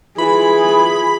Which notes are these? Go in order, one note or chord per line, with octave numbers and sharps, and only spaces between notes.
E3 F4 G#4 B5